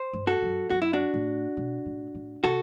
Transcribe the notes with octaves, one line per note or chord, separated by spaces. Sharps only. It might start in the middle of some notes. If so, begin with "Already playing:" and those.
Already playing: C5
G2
F#4 A4
F#2
F#2 F#4
E4
D4 F#4
A2
B2
A2
A2
C3 F#4 A4